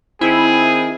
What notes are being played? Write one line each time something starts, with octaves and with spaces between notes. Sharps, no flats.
D#3 C4 E4 G#4